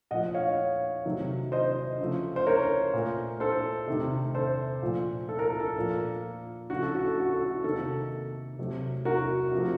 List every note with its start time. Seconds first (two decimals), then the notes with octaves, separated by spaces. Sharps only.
0.11 A#2 F3 A3 D#5 F#5
0.34 C#5 F5
1.05 C3 D#3 F#3 A3
1.52 C5 D#5
1.99 C#3 F3 A3
2.36 C5
2.46 A#4 C#5
2.93 A#2 A3
3.40 A4 C5
3.87 C3 D#3 A3
4.35 A4 C5
4.82 A#2 F3 A3
5.29 A4
5.39 A#4
5.44 A4
5.60 A4
5.76 A#2 F3 A#3
6.70 C#3 F3 A3 F#4
6.82 A4
6.95 F#4
7.07 A4
7.20 F#4
7.33 A4
7.45 F#4
7.64 C3 D#3 A#3 A4
8.59 C3 F#3 A3
9.05 F#4 A#4
9.52 C3 F3 A3